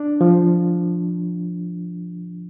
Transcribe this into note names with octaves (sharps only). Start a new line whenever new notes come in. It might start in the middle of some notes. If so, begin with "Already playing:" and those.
Already playing: D4
F3